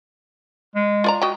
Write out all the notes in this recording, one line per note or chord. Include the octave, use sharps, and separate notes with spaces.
G#3
F4 D5 A#5
F#4 D#5 G5